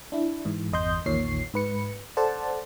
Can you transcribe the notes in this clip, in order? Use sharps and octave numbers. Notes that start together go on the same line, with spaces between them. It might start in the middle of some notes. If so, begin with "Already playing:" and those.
D4 E4
G#2 E3
G1 E2 D#5 C6 G6
A#1 E2 A#2 D#3 C#5 C7
G#2 B4 C#7
A4 C5 D5 F#5 A5